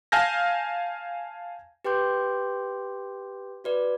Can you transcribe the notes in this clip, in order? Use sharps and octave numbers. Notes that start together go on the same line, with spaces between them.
F5 G#5 A5 F6 G6 A#6
G4 B4 G5 C6 D6 G6
F#4 B4 D5